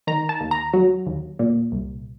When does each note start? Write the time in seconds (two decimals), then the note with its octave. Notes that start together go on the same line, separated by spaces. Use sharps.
0.07 D#3 A#5
0.29 A5
0.41 D#2
0.51 A#5
0.73 F#3
1.06 D#2
1.39 A#2
1.72 C2